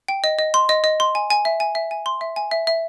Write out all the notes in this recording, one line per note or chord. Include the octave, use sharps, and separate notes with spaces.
G5
D#5
D#5
C6
D#5
D#5
C6
G#5
G#5
E5
G#5
E5
G#5
C6
E5
G#5
E5
E5